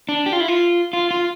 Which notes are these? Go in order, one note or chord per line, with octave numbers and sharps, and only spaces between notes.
D4
G4
F4
E4
F4
F4
F4